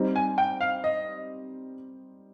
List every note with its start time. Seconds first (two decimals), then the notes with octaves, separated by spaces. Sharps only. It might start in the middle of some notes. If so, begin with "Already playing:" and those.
Already playing: G3 C4 D#4
0.16 G#5
0.38 G5
0.61 F5
0.84 D#5